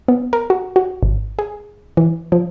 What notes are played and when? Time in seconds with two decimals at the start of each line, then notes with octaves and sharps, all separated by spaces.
0.08 B3
0.33 A#4
0.50 F#4
0.76 F#4
1.03 G#1
1.39 G#4
1.97 E3
2.32 F3